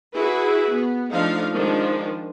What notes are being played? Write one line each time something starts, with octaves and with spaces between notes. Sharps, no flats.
E4 F#4 G#4 B4
B3
F3 A3 D4 D#4 F5
D#3 F3 G#3 D4